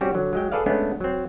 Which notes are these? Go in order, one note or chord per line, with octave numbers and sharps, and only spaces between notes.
G3 C4 C#4 F#4 G4
D3 F#3
F#3 G#3 G5
G#4 A4 B4 D5 F5
G#3 A3 B3 C#4 D4
F#3 C4